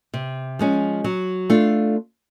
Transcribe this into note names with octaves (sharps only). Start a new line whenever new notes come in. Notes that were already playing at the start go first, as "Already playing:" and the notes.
C3
F3 G#3 C#4
F#3
A3 D4 F4